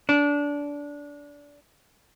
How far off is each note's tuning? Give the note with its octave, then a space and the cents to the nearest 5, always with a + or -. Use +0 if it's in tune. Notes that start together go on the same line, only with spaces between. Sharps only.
D4 -20